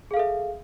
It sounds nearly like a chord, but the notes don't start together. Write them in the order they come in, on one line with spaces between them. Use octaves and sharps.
G#4 F5 A4 E5